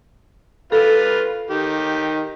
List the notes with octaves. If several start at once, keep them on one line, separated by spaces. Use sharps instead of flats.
F4 A4 B4 F5
D#3 G4